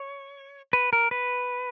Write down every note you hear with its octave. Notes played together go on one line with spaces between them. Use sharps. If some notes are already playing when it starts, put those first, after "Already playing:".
Already playing: C#5
B4
A#4
B4